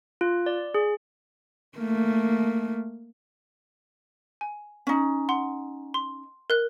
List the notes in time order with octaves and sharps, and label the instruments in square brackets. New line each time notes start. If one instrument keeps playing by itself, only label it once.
[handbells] F4
D5
G#4
[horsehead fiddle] A3 A#3
[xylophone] G#5
[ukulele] C#4 D#4
[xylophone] F#5 C6
C6
A#4 F#6